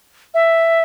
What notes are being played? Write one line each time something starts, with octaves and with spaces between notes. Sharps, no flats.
E5